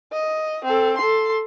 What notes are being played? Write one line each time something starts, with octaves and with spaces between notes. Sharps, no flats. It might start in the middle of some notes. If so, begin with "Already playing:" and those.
D#5
C4 A4
A4 C6